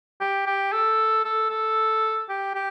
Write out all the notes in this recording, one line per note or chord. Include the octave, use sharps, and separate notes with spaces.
G4
G4
A4
A4
A4
G4
G4